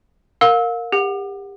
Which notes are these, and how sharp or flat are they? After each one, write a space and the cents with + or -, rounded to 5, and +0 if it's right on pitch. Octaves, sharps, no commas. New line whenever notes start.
A#4 -10 F5 +30 E6 -25
G4 +30 F#5 +0